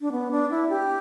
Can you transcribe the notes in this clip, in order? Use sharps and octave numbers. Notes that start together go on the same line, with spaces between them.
D4
B3
D4
E4
G4